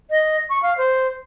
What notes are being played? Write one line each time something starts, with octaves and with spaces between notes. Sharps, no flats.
D#5
C#6
F5
C5